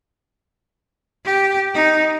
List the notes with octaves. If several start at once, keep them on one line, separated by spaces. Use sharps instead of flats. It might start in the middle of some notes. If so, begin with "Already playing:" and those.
G4
D#4